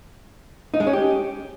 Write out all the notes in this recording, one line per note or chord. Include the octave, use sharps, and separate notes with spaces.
D#4
G#3
C#4
G4